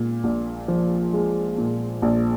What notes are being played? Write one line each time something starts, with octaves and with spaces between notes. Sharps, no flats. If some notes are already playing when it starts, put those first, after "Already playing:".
Already playing: A#2 G#3
A#1
F3
G#3
A#2
A#1